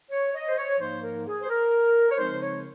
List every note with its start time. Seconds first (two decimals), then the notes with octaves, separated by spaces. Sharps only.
0.12 C#5
0.35 D#5
0.48 C5
0.58 C#5
0.80 G#2 F3 A#3 D#4 C5
1.04 A#4
1.27 G#4
1.41 C5
1.49 A#4
2.11 C#5
2.19 C#3 F3 G#3 C4 D#4 C5
2.42 C#5